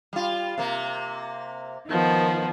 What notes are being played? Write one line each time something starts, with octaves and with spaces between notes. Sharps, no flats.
G3 F4
C3 A#3
D#3 F3 B3